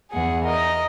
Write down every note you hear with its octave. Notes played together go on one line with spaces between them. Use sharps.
E2 G#4 F#5
A#4 D#5